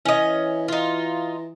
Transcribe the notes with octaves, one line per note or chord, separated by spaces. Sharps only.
E3 C#4 D#5
D#4 F4